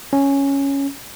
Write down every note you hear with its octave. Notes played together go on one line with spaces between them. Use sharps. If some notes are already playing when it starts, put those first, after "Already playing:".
C#4